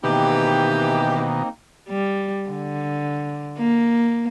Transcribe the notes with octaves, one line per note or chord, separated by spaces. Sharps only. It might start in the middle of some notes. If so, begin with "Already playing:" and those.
B2 D#3 E3 A#3 C4 D#4 G4
G3
D3
A#3